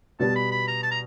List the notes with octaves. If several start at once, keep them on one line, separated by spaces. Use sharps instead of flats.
B2 G3 B3 A5
B5
B5
A#5
A5
A#5